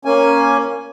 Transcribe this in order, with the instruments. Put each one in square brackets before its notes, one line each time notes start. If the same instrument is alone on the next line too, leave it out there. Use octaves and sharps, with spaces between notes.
[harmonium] A#3 C#4 G#5